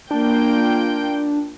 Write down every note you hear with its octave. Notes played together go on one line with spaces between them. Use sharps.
A#3 D4 F4 G5